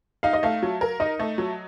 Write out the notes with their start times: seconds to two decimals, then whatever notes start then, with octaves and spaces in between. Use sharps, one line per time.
0.23 D#4 F5
0.33 D#5
0.43 A3 F5
0.62 F#3
0.81 A#4
1.00 D#4 D#5
1.19 A3
1.38 F#3